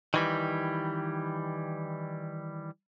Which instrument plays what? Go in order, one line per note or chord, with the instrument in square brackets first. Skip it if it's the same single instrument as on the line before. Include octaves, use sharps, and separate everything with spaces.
[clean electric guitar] D#3 E3 G3